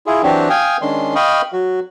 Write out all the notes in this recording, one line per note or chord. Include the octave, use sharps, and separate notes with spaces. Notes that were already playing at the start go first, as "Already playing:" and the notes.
E4 F4 G#4
E3 F#3 C4 D4 F#4 G4
F5 G5 G#5 D#6
D#3 G#3 C#4 D4 C6
D#5 F5 G5 B5 C#6 D#6
F#3 F#4